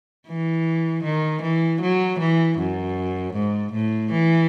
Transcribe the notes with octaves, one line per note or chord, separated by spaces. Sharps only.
E3
D#3
E3
F#3
E3
F#2
G#2
A2
E3